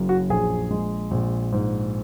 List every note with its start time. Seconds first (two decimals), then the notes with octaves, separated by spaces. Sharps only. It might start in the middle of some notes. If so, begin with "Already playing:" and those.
Already playing: F#1 F#2
0.09 F#4
0.29 A#1 G#4
0.71 G#3
1.11 A#1
1.52 G#2